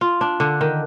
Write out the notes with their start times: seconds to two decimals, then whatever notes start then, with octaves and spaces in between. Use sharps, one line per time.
0.01 F4
0.21 D4
0.40 D3
0.61 D#3